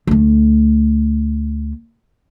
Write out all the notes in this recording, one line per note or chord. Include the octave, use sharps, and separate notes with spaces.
D2 A3